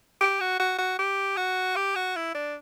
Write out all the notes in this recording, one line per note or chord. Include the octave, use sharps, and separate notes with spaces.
G4
F#4
F#4
F#4
G4
F#4
G4
F#4
E4
D4